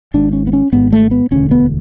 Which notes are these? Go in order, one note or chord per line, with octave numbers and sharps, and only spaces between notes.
G#1 G#2 D4
C#4
B3
C#4
G#1 G#2 B3
A3
B3
E1 D2 D3 C#4
B3